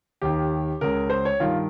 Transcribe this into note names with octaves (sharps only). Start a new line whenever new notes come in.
D#2 D#3 G4
C#2 C#3 A#4
C5
C#5
G2 D#3 F4